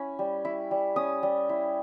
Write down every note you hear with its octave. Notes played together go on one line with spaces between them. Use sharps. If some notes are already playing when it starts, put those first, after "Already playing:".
Already playing: C#4 E4 B5
G3
E4
G3
C#4 D#6
G3
E4